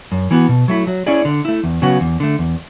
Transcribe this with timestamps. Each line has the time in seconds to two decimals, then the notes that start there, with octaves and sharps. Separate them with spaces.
0.12 F#2
0.31 E3 B3 F#4
0.49 B2
0.68 F#3 A3 E4
0.87 F#3
1.06 C#4 E4 G#4 D5
1.25 D3
1.45 A3 E4
1.64 E2
1.82 C#3 F#3 B3 F#4
2.01 E2
2.20 D3 A3
2.39 E2